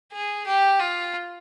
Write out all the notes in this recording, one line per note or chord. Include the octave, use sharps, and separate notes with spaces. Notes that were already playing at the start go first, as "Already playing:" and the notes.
G#4
G4
F4